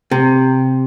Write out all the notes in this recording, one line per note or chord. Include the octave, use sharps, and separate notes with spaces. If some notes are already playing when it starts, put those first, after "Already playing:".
C3